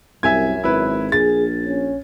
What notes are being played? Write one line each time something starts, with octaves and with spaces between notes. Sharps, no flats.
C2 F#2 E5 G#5 G#6
G#1 E4 B4
A#1 G#4 A6
C#4